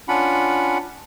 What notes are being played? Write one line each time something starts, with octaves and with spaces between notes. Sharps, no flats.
C#4 D4 F4 F#5 B5